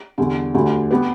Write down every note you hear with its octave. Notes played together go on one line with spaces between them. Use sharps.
E2 D3 G3
D2 D3 G3
G3 B3 G4 B4